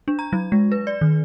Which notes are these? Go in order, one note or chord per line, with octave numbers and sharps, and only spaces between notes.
D4
A#5
F#3
G#3
B4
D5
D#3